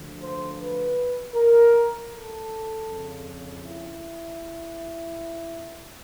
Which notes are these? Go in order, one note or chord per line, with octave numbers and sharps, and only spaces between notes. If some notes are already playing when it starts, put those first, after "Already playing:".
Already playing: D2 D3 F3
C5
B4
A#4
A4
F2 C#3 F3
E4